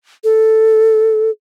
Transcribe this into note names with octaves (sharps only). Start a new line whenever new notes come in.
A4